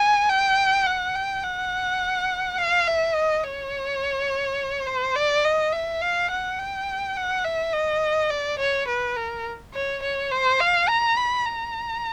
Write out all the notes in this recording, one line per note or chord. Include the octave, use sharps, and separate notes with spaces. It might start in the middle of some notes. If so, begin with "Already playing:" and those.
Already playing: G#5
G5
F#5
G5
F#5
F5
E5
D#5
C#5
C5
D5
D#5
E5
F5
F#5
G5
F#5
E5
D#5
D5
C#5
B4
A#4
C#5
C#5
C5
F5
A#5
B5
A#5